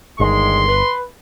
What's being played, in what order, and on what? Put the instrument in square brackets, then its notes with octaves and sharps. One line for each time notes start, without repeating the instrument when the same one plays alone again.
[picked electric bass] G1 [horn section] D#3 G#3 [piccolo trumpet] C6
[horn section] B4